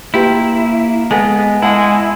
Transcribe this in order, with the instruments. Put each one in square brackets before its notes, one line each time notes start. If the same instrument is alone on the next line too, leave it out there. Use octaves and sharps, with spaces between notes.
[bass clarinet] A#3 [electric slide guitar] E4 [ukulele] F4 G4 B4
[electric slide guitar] G#3 B3 [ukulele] A4 F#5 [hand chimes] G#5
[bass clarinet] G#3 [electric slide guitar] E4 [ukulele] F5 F#5 A5